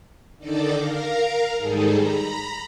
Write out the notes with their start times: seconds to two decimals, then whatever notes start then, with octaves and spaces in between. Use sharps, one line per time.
0.38 D3 D#3 D#4 A4 D5 D6
0.74 A#4 F5 A#5
1.57 G#2 D#3 G3 D#4 G#4 A4
1.94 A#5 B5